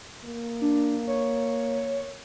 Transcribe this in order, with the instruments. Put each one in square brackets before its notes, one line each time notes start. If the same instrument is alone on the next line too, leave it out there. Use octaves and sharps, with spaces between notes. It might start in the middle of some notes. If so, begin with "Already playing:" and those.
[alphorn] A#3
[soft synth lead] D4
C#5